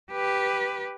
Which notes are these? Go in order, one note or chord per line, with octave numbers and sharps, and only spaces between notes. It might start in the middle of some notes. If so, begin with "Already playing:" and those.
G4 B4